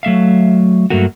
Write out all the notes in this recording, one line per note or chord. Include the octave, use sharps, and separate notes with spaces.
F#3 A3 E5 F5
G2 F#3 A3 A#3 F#4